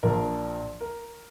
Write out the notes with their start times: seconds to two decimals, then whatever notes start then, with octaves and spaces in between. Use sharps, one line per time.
0.03 A#1 A#2 F3 A#3 D4 A#4
0.81 A#4